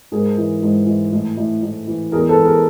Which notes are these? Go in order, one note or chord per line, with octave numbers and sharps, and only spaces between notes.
G#2 G#4 A#4
E3
G#2
E3
A2
A2
A2
E3
E2 G#4 A#4
A4 B4
E2
G#4 A#4